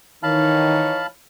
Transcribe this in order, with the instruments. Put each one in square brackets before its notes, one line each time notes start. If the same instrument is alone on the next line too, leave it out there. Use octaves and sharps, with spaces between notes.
[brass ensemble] D#3 [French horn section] E3 D#4 C#5 [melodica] F5 A5 B5